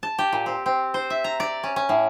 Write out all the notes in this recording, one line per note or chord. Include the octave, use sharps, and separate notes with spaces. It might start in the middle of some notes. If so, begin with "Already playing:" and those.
A5
G4
A#2
C4
C4
C5
E5
A#5
D5
C#4
C#4
A2